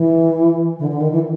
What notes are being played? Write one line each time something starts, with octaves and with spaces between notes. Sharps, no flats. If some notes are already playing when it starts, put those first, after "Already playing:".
Already playing: E3
D3
D3
D#3
E3